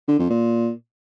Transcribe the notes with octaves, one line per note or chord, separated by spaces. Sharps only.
D3
F2
A#2